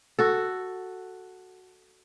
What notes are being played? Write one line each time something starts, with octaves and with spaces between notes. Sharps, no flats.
F#4 A4